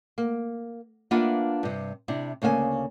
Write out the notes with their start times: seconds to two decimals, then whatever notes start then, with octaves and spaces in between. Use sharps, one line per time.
0.18 A#3
1.11 A#3 D4 F4 B4 E5 F#5
1.63 G2 C3
2.08 C3 D4 E4
2.42 D2 C#3 A#3 E5 G#5